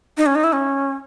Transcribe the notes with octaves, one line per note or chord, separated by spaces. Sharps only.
D#4
C#4
D#4
E4
C#4